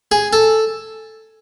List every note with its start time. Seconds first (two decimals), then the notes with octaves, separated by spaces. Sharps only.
0.12 G#4
0.33 A4